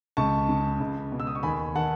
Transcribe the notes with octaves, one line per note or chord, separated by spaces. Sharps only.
C#2 A5 C#6
C#3
C#2
B2
E6
D#6
C#6
D#2 G#5 B5
D#3 F#5 A5